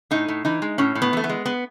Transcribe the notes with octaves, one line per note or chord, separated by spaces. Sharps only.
A2 D#4
A2
E3 D#4
G#3
A2 C#4
A2
B3
E3 A3
B3
G#3
B3